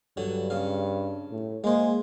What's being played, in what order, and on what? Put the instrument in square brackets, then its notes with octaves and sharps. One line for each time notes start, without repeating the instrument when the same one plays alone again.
[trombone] G2 [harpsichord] D3 F#3
[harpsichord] C#3 F5
[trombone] A2
[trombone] G#3 [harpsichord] A#3 C5